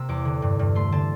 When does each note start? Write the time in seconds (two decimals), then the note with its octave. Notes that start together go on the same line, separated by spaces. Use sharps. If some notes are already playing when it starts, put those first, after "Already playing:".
Already playing: C3 A#3 E6
0.09 E2 D6
0.25 D3
0.42 G2
0.59 G2
0.75 A3 C6
0.92 D3 A5